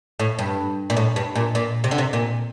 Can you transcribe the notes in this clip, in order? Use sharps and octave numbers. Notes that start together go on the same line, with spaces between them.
A2
G2
A#2
A2
G2
A#2
A#2
C3
D3
C3
A#2